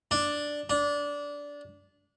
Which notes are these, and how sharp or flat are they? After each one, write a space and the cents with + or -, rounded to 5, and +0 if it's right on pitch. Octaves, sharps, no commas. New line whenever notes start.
D4 +0
D4 -20